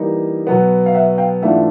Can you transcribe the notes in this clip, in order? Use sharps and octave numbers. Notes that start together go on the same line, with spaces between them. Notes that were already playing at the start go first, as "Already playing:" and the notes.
Already playing: E3 G3 A#3 D#4
B2 F#3 B3
F5
E5 F#5
F5 G5
G#2 E3 A3 D4 F4 E5 F#5